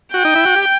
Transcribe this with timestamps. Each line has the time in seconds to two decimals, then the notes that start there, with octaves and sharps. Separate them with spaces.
0.14 F#4 G5
0.25 D#4
0.35 E4
0.45 F#4
0.56 G4